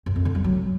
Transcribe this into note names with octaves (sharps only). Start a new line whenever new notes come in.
F#2
F2
D3
G3
F#3